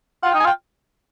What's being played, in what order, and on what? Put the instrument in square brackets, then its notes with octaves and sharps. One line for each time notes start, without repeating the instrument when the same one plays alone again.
[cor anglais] F4 [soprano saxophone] F#5
[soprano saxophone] G5
[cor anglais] D#4
[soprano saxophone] G#5
[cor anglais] F4 [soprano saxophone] G5